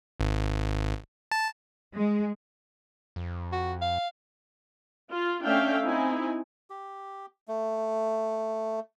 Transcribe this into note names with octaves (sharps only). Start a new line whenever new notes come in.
G#1
A5
G#3
F2
F#4
F5
F4
A3 C#4 D4 E5 F5 G5
C4 D#4 E4 G#5
G4
A3